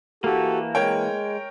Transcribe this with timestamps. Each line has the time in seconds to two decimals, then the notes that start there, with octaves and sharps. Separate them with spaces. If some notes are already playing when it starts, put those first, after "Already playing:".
0.24 E3 A#3 F#4 G4 A4
0.75 G#3 A#4 C#5 G5